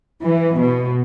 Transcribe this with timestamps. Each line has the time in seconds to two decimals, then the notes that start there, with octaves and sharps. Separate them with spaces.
0.23 E3
0.59 B2